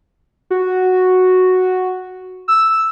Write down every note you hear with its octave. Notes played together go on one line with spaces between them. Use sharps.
F#4
E6